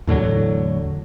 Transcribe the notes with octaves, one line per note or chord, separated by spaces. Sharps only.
E2 A2 D3 F#3